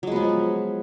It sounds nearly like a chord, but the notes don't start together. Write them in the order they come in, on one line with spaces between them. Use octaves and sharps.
F#3 G#3 B3 F3